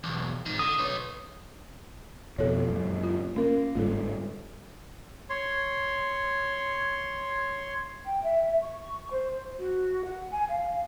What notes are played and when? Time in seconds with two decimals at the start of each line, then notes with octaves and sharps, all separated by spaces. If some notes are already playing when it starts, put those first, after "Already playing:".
0.04 B1 E2
0.46 G#2 D#3
0.59 D3 D#6
0.79 B4 C#5
2.38 F2 B2 F3 A4 C#5
2.70 F#2 A#2
3.03 F4
3.36 A#3 C#4 A#4
3.75 G1 G#2 G3 F4 A4
5.30 C#5 C6
8.05 G5
8.23 E5
8.62 C#6
9.11 C5
9.59 F#4
10.05 F#5
10.31 G#5
10.49 F5